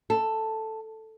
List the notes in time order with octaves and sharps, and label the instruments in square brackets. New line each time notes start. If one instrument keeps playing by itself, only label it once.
[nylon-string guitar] A4